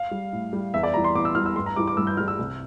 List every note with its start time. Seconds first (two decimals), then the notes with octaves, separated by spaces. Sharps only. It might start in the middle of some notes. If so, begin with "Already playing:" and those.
Already playing: F5
0.11 G3
0.33 A2
0.53 G3
0.74 E2 E5
0.83 D5
0.94 E3 G3 A#5
1.04 C6
1.15 E2 D6
1.25 E6
1.35 E3 G3 F6
1.46 E6
1.56 G2 C6
1.66 A#5
1.76 E3 G3 D6
1.87 D6
1.97 G2 E6
2.07 G6
2.17 E3 F6
2.20 G3
2.28 E6
2.39 C2